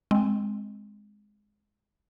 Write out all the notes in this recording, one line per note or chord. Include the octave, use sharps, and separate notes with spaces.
G#3 C4